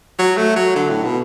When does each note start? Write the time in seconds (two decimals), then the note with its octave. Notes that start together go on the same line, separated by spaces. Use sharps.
0.19 F#3
0.37 A3
0.56 F#3
0.76 D3
0.89 A2
1.04 B2